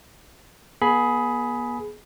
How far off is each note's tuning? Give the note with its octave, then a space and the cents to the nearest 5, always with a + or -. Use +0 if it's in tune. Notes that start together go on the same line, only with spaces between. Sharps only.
B3 -40 G#4 +15 B5 +0